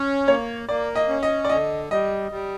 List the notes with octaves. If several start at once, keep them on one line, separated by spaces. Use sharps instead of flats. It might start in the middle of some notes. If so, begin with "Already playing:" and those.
Already playing: C#4
A#3 C#5
A#3 D5
D#5
C#4
D#5
D5
D3 D#5
G3 D#5
G3